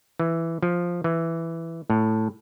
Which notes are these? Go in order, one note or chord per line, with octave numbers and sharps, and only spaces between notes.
E3
F3
E3
A2